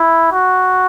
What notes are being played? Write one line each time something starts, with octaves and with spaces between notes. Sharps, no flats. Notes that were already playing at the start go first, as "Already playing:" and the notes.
Already playing: E4
F#4